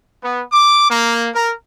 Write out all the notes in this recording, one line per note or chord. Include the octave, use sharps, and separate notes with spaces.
B3
D6
A#3
A#4